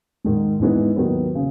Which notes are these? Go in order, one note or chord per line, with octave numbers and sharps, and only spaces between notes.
G#2 D#3 G#3
G#2 E3 G#3 B3 D#4
D#2 D#3 F#3 B3
C#3